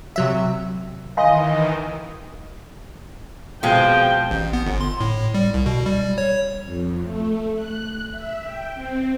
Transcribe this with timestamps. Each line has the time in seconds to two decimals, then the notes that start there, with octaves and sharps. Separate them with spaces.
0.16 C3 F#3 E5
1.17 D#3 E3 D#5 F5 G#5 C6
3.63 B2 F3 G#3 C4 F5 G5
4.31 A1
4.53 B3
4.66 G1
4.81 C6
5.00 A2
5.34 G3
5.54 C2
5.66 B2
5.86 G3
6.18 C#5
6.65 F2
7.03 A3
7.55 F#6
8.11 E5
8.44 G5
8.75 C4